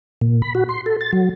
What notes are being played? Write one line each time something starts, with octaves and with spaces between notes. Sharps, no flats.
A#2
B5
F#4
C6
A4
A6
F#3